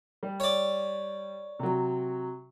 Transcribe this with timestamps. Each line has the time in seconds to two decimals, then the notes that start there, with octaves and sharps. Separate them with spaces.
0.23 G3
0.40 C#5 D5
1.59 C3 F#3